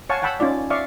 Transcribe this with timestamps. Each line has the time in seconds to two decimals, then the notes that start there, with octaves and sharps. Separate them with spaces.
0.10 C#5 F5 F#5 G#5 A5 C#6
0.22 F#5 G5 A5 B5 E6
0.40 C#4 D#4 F4 D5
0.70 D5 E5 F5 C#6